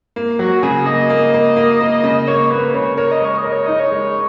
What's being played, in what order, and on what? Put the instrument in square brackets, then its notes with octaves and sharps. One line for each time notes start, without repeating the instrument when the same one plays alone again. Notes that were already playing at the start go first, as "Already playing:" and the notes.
[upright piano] A#3
[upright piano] F#3 [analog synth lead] F#4
[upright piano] C#3 [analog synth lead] G#4
[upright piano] A#3 [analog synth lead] D#5
[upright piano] A#3
A#3
A#3
A#3
C#3
[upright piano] A#3 [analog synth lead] C#5
[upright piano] A#3 [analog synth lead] B4
[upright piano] C#3 [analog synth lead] C#5
[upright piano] A#4 [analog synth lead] C#5
[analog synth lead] D#5
[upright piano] G#3 [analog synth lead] C#5
[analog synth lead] D#5
[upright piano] A#4
[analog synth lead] C#5
[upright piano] D#4 [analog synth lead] D#5
[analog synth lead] C#5
[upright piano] G#3